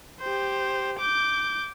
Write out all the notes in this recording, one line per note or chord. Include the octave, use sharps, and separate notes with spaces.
G4 C5
D6 G6